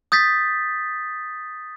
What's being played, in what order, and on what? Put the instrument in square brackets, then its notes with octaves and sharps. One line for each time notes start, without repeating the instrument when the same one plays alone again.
[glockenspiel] D#6 G6 A6 B6